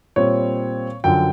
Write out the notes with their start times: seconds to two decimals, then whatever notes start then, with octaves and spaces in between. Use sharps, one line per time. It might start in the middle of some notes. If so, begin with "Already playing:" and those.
0.16 A#2 G3 C4 C#5
1.04 F#2 D3 F3 G5